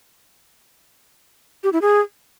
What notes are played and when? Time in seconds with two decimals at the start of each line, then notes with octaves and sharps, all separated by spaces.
1.63 G4
1.73 E4
1.82 G#4